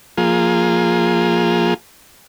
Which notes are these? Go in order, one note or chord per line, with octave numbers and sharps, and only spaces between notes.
F3 A#3 F4 G#4